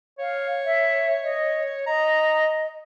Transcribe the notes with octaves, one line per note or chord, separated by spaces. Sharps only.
C#5 F5
E5
D#5
D#5 A#5